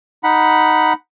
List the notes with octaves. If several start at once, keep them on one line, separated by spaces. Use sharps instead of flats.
D#4 F#5 B5